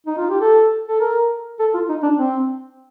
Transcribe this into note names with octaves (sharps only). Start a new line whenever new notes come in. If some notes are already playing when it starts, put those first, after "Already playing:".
D#4
F4
G4
A4
A4
A#4
A4
F4
D#4
D4
C4